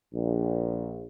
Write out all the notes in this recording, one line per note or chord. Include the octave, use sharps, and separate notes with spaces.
A#1